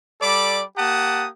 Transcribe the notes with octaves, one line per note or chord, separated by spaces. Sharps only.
G3 A4 D5 B5 D6
A#3 G4 F#5 A5 D#6